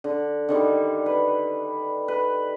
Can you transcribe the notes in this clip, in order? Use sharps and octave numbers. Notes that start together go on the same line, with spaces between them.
D3
D3 D#3 G3
B4
B4